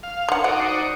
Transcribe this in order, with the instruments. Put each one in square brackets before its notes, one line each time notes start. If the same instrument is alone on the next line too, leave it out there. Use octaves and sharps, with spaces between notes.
[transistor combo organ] F5
[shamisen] D3 F#5
[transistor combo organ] D#4 F#4 D5 [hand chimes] C5 [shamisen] F#5
[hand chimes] D#6 C7 C#7